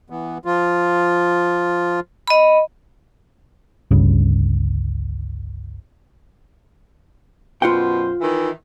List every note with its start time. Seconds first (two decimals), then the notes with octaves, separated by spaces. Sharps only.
0.10 E3 B3
0.45 F3 F4
2.27 D#5 B5
3.91 G1 C#2 G2 C#3
7.62 F#2 B2 F4 C5 F#5 G5
8.21 D#3 E3